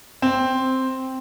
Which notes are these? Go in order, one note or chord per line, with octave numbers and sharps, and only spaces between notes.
C4